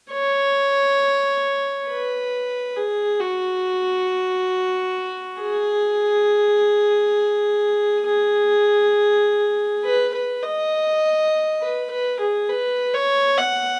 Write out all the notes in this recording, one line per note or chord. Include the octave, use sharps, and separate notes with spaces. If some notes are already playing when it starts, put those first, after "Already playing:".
C#5
B4
G#4
F#4
G#4
G#4
B4
B4
D#5
B4
B4
G#4
B4
C#5
F#5